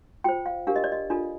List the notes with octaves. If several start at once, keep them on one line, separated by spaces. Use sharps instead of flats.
F4 C5 G5
F5
D4 G4 A#4 F5
D#5
D5
D#5
D4 F4 A4